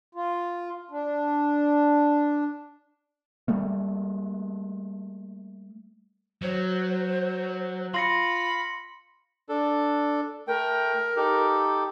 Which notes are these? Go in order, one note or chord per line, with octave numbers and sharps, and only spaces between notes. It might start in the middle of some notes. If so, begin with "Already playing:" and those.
F4
D4
G3 A3 A#3
F#3 C5
F4 B5 C6 A#6 C#7
D4 A4
A3 A#4 G5
D#4 G4 A4